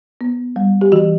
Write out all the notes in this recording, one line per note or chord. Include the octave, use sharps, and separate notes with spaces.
B3
G3
G4
E3 F#4